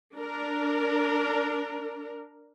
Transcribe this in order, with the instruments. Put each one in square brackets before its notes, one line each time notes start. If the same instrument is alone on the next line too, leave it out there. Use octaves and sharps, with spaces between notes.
[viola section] D4 A#4